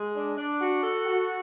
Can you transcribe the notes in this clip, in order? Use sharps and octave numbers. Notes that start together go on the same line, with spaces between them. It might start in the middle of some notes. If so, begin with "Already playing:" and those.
Already playing: G#3
D4
D4
F#4
A4
F#4